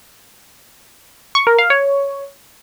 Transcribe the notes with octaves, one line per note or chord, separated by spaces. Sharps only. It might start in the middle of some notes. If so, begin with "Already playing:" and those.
C#6
A#4
F5
C#5